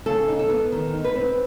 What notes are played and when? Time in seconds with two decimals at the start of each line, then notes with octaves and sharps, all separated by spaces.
0.06 C#3 A4
0.28 D#4
0.39 A4
0.50 B3
0.72 D#3
0.94 D#4
1.04 B4
1.15 C4